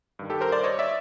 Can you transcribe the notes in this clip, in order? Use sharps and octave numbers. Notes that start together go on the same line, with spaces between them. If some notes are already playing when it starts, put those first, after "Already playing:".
G2 D#3
G4 A4
A#4 C5
C5 D5
C#5 D#5
D5 E5